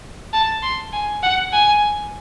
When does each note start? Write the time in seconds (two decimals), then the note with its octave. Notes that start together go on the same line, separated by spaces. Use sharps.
0.33 A5
0.63 C6
0.93 G#5
1.23 F#5
1.53 G#5